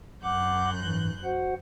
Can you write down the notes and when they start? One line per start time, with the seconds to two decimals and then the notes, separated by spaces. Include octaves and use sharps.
0.23 F#2 F#5 D6 F#6 G6
0.83 G#2 E3
1.24 F#4 C5 F#5